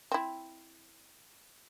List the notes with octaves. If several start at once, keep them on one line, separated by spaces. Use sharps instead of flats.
C4 E4